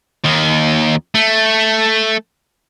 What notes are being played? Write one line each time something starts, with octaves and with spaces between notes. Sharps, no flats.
D#2 D#3
A3